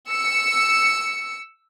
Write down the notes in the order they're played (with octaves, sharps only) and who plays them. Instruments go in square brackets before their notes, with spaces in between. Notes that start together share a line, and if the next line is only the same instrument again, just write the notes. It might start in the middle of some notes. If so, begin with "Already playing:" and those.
[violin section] E6 C#7